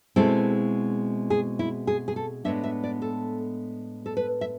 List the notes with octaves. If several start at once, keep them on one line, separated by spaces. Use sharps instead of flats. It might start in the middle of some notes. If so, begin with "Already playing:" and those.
B2 G#3 C4 E4 A4
G#4
E4
G#4
G#4
A4
A2 G#3 B3 D4 E5
E5
D5
A4
A4
B4
E5